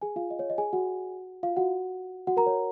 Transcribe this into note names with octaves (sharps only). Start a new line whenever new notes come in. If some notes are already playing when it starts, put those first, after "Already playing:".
G#4 G#5
F4 F5
D#5
C#5
D#5
G#4 G#5
F#4 F#5
F4 F5
F#4 F#5
F#4 F#5
A#4 A#5
C#5